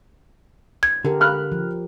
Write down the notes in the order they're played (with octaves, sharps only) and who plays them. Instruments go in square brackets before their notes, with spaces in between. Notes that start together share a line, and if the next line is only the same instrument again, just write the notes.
[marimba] G#6
[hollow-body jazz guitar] D3 [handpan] G4 A#4
[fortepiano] B5 F6 F#6
[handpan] F3